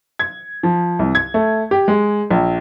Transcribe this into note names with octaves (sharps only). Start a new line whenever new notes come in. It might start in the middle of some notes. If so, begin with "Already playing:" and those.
G#6
F3
C2
G#6
A3
G4
G#3
A#1